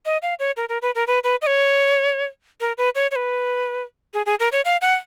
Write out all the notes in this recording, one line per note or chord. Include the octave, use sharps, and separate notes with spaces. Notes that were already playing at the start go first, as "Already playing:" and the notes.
D#5
F5
C#5
A#4
A#4
B4
A#4
B4
B4
D#5
C#5
A#4
B4
C#5
C#5
B4
G#4
G#4
A#4
C#5
F5
F#5